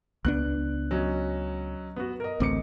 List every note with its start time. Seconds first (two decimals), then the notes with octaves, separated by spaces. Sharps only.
0.25 C#2 B3 D4 F#6
0.91 F#3 C#4 D#5
1.96 B3 F#4
2.20 A#4 D#5
2.40 A1 D2 C4 D#5 D6 C#7